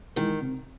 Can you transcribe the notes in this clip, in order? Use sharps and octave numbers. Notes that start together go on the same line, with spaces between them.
D#3 E3 G#3
C3